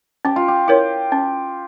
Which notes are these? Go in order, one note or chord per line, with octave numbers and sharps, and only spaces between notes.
C#4 G4
F4
G4
E4 G4 A#4 C#5
C#4